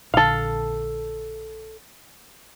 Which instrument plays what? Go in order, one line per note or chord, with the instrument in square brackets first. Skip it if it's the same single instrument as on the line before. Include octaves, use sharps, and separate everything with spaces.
[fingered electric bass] A#1 D3 [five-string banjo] A4 F5